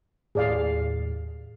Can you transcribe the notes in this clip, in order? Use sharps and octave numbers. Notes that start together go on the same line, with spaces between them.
D#2 A2 G#4 D5 F5